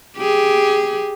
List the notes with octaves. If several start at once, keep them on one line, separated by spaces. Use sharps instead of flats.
G4 G#4